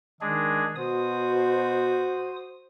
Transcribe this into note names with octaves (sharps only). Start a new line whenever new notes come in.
D#3 G#3 D4 G#4
B2 F#4 C5 D#6